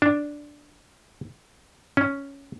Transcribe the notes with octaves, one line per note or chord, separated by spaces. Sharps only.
D4
C#4